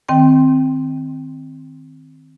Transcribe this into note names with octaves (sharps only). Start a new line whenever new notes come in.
D#3 C4 G5